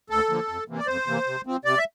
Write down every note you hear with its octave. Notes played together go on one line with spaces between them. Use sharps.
D2 A4
D3 F3 A#3
F2
C3 E3 A#3
D5
F2 C5
C3 E3 A#3
C3
F3 C4
C3 D5
E5